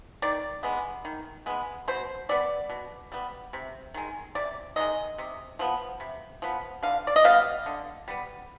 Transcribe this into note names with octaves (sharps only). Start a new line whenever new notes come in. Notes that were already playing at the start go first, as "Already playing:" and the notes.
D#3 D5
G#3 B3
D#3
G#3 B3
B2 C5
G3 B3 D5
B2
G3 B3
C3
D#3 G#3
C3 D5
D#3 G#3 D#5
C3
F3 B3
C3
F3 B3
D3 F5
D5
D#5
G3 B3 F5
D3
G3 B3